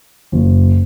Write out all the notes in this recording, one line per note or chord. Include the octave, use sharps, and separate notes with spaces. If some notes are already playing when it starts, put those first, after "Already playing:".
F#1